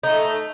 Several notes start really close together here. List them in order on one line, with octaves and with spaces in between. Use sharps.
D#4 B3 A3